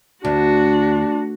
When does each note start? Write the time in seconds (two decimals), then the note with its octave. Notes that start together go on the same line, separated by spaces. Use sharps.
0.25 D2 D4 F#4